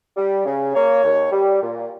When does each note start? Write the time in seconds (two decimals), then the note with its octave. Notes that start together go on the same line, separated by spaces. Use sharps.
0.17 G3
0.46 C#3
0.75 A#3 C#5
1.04 D#2
1.32 G3
1.61 A#2